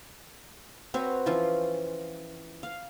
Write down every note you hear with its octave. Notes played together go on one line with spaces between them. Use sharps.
C4 F#4 B4 C#5
E3 F3 C#4 F4
F5